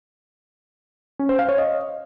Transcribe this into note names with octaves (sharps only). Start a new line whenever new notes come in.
C#4
C5
F5
C#5
D#5